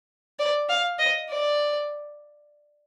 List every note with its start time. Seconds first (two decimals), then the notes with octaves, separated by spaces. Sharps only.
0.39 D5
0.69 F5
0.99 D#5
1.29 D5